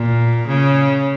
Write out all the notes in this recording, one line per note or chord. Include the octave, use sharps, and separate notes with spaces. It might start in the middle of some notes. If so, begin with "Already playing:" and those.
Already playing: A#2
C#3